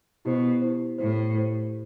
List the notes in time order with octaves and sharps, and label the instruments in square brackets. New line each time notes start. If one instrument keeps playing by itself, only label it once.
[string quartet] B2 [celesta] E4 G4 C5
[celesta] E4 G4 C5
[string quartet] A2 [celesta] E4 G4 C5
[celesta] E4 G4 C5